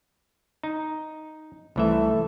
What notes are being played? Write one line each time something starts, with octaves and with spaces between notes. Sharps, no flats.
D#4
C2 E3 A3 E5